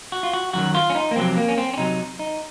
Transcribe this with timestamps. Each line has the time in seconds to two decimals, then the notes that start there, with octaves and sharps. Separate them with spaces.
0.12 F#4
0.23 F4
0.33 F#4
0.53 F#2 D#3 F#3 F#4
0.75 F4
0.90 C#4
0.95 D#4
1.11 A#3
1.16 F2 C3 F#3 C4
1.37 A#3
1.48 C#4
1.58 C4
1.74 C#4
1.78 C3 F#3 D#4
2.19 D#4